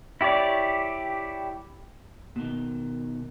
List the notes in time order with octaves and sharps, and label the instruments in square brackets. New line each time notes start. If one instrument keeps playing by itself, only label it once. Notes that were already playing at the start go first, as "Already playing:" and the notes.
[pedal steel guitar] E4 G4 C#5 D5
[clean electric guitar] B2 D#3